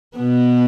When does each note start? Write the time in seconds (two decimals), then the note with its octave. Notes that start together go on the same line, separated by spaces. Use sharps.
0.17 B2 B3